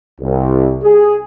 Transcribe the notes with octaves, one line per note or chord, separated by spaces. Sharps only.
C2
G#4